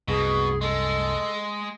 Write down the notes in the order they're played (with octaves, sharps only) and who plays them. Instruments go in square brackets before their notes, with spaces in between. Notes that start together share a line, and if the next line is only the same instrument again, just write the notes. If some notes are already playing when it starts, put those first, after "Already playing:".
[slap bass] C2 F#2 [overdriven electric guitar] B2 [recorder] G#4
[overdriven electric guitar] G#3 [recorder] A4